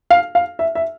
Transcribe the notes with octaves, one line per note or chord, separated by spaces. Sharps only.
F5
F5
E5
E5